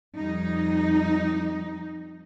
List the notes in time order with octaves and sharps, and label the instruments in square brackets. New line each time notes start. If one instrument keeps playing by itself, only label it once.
[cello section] F2 G3 D#4